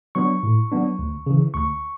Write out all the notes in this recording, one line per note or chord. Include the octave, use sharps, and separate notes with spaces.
F#3 B3 D4 C#6
A2
F#3 B3 D4
D2
C#3 E3
D2 C#6